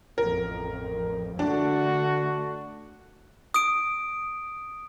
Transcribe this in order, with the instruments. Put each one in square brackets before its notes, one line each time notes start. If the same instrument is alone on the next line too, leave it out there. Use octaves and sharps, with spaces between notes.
[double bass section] A1 F2 [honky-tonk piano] A#4
[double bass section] D3 A3 [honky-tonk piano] D4 [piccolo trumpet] F#4
[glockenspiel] D#6 D7